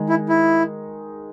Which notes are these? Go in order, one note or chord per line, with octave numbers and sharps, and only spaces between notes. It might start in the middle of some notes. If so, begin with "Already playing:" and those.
Already playing: D#3 G#3 D#4 G#4
E4
E4